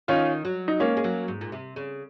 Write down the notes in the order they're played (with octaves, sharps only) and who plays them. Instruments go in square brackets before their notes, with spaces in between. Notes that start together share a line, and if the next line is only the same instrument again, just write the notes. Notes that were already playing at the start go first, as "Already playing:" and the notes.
[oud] D#3 [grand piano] C#4 F4
[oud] F#3
[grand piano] D#4
[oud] G#3 [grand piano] A#3 C#4
[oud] G#3
F#3
G#2
A#2
C3
C#3